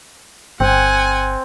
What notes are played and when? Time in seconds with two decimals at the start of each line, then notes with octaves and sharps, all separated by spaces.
0.60 G1 C4 F#5 G#5